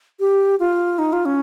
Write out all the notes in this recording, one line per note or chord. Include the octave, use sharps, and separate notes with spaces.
G4
F4
D#4
F4
C#4